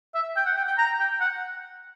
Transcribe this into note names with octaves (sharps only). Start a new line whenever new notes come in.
E5
G5
F#5
G5
G5
A#5
G5
F#5